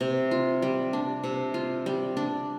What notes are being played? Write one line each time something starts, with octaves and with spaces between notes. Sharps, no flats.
C3
F4
G3
D4
C3
F4
G3
D4